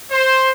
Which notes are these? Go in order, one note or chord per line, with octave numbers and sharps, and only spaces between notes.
C5